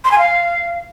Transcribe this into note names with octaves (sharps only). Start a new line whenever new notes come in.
C6
G#5
F5